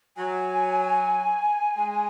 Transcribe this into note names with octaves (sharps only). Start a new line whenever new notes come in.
F#3 G#5
G#3